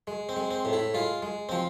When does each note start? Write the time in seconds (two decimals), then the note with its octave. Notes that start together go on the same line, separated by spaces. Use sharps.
0.07 G#3
0.29 C4
0.36 G#3
0.51 C4
0.65 A2
0.73 E4
0.94 G#3 F4
1.22 G#3
1.49 F3 C4